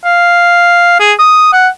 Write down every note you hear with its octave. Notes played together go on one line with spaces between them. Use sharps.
F5
G#4
D#6
F#5